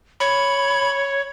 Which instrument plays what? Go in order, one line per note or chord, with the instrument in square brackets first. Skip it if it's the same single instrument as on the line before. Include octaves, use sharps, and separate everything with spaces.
[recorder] C#5 [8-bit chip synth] B5